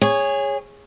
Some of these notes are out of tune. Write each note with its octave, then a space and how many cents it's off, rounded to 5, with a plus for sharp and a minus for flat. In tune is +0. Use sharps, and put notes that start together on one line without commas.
G#4 -20 C#5 +0